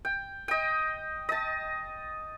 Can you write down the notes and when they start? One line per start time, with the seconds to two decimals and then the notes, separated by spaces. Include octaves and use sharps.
0.05 G5
0.48 D#5 G5
1.29 D#5 A5